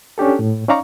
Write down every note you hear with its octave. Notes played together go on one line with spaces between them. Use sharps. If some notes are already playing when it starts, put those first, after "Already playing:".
C#4 D4 G4 A4
A2
C#4 D#4 D5 F5 A#5 C#6